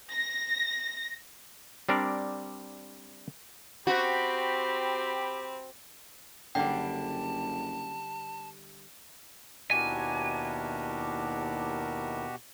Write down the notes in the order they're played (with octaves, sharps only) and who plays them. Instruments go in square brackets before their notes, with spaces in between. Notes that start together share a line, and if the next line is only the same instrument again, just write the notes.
[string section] A#6
[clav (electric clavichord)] G3 C4 D4 A#4 D5
[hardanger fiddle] C4 [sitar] F#4 [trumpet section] G4 B5
[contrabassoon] F#1 [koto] D3 G3 [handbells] G5 [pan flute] A5
[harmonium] D#2 E4 A#4 [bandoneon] B2 F#4 G4 [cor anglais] D4 [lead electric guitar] G#5